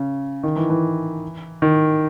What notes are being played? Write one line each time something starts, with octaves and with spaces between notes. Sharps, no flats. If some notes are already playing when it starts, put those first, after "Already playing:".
Already playing: C#3
D#3
E3
E3
D#3